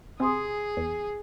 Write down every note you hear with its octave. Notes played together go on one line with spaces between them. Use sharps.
C3 G#4 G#5 C6 D#6
E2